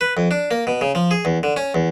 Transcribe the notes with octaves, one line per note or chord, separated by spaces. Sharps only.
B4
F2
D4
A#3
B2
C#3
F3
G#4
E2
D3
C#4
E2